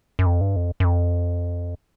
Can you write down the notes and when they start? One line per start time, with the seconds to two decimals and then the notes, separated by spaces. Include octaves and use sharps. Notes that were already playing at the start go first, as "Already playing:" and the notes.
0.19 F#2
0.26 F2
0.41 G2
0.56 F2
0.80 F#2
0.85 F2